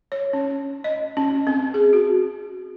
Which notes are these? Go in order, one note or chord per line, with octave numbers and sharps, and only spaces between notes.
C#5
C#4
D#5
C#4
C4
G#4
F#4